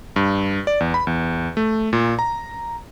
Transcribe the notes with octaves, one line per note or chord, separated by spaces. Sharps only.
G2
D5
E2
B5
E2
A3
A#2
A#5